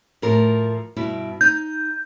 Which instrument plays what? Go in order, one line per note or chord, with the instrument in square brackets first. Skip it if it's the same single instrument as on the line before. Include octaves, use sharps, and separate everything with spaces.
[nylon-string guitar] A2 F3 A#4
G2 B2 E4
[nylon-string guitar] D#4 [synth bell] G6